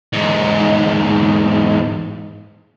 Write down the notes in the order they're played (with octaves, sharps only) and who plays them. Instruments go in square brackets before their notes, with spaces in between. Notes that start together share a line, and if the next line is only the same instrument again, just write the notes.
[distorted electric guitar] E2 G#2